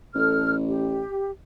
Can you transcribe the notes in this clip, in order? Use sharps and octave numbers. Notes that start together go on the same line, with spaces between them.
A1 A4 F6
G4